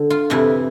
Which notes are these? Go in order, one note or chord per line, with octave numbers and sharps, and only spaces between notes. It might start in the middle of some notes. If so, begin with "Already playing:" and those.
Already playing: D3
F4
F2 C3 E3 E4